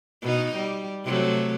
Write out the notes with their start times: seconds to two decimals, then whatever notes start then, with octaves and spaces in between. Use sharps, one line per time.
0.22 B2 D#4
0.56 G3
1.04 C3 F#3 A3